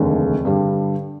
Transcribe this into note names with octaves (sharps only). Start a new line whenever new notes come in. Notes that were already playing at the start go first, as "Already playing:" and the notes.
Already playing: F1 D#2 D3 G#3
G2 D3 G3